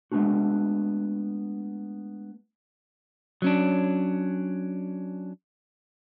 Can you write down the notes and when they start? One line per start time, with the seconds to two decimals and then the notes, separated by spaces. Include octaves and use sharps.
0.12 G#3 A3 B3 C4 D4 F#4
3.42 F#3 C#4 D4